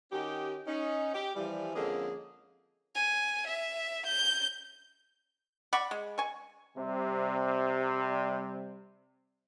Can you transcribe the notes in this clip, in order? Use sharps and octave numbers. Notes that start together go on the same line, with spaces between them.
D#3 C#4 D#4 F#4 G4
C#4 D#4
G4
E3 F3 G3
F2 D3 G#3 A#3 C#4 G#4
G#5
E5
G6
D5 F#5 B5 C#6
G#3
G#5 C#6
C3 G3